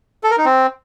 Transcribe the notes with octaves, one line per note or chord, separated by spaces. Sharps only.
A4
A#4
D#4
C4